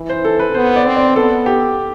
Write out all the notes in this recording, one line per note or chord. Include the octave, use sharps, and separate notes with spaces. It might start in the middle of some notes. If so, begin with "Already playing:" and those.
Already playing: E3
C5
A4
B4
B3 C5
D5
C4
D5
B3 A4
G4